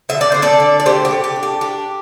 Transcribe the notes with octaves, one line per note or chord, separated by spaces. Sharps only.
D3 E5
D5
D3 C5
A4 D5
D3
D5
A3 G4 C5
G4
A3
G4
D4
G4
D4 G4